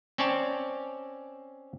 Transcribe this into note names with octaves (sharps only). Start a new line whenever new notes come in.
C4 C#4 C#5 D5 A5